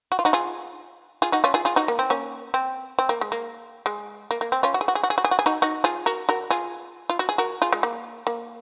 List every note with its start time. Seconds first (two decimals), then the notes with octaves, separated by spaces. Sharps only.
0.12 F#4
0.19 F4
0.25 D#4 F#4
0.33 F4 G#4
1.22 F4 G#4
1.32 D#4 F#4
1.44 C#4 F4
1.54 F4 G#4
1.65 F4 G#4
1.76 D#4 F#4
1.88 A#3
1.99 C4
2.10 A#3 C#4
2.54 C4
2.99 C4
3.09 A#3
3.21 G#3
3.32 A#3
3.86 G#3
4.31 A#3
4.41 A#3
4.52 C4
4.63 C#4 F4
4.74 F#4
4.81 G#4
4.88 F#4
4.95 G#4
5.03 F#4
5.10 G#4
5.18 F#4
5.25 G#4
5.31 F#4
5.39 G#4
5.46 D#4 F#4
5.62 D#4 F#4
5.84 F4 G#4
6.06 F#4 A#4
6.29 F#4 A#4
6.51 F4 G#4
7.10 F4
7.19 F#4
7.29 G#4
7.38 F#4 A#4
7.62 F4 G#4
7.73 G#3
7.83 A#3
8.27 A#3